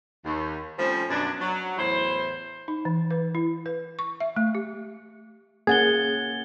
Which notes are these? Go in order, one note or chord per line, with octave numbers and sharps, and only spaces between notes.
D#2
F3 G3 A3 C4 C#4
F#2 B2 D4
F#3
E2 A2 E4 C5
D#4
E3
B4
E4
B4
C#6
E5
A3
G4
A#3 C#4 G#4 F#5 G#6 A6 G7